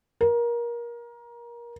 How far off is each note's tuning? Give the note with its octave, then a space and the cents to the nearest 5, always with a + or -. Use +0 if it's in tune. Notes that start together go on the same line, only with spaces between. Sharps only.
A#4 +25